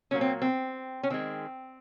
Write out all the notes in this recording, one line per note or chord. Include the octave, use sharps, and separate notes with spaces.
A#2 F#3 A#3 C#4
C4
C4
C#4
D#3 G#3 C4